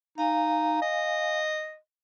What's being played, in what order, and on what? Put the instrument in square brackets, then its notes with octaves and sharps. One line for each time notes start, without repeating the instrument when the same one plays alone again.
[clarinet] D#4 [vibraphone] F5 G#5
[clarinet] D#5